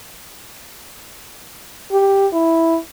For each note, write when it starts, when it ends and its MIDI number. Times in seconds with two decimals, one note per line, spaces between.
1.91 2.27 67
2.33 2.76 64